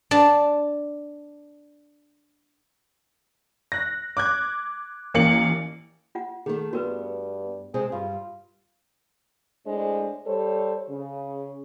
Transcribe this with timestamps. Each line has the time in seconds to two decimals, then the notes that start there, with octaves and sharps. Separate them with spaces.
0.11 D4 A5
3.72 F#6 A#6
4.17 D6 F#6 G#6
5.14 A1 A#3 C#4 C#7 F#7
6.15 F4 F#5
6.46 D#3 A3 G#4
6.73 G2 B3 F#4 A#4 B4
7.74 C3 G#3 C4 G#4
7.92 G2 F4
9.66 A2 G#3 D4 C5
10.26 G3 A4 C5 C#5
10.89 C#3